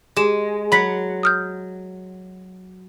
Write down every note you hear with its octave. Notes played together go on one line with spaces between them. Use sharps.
G#3 G4 E7
F#3 F#5 B5 B6
D#6 F6 G6